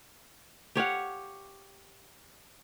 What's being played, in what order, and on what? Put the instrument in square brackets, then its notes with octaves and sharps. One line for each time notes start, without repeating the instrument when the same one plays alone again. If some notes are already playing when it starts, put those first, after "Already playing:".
[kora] G4 C#5 F5 F#5